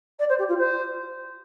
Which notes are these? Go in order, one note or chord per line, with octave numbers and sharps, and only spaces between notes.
D5
C5
G4
F4
C5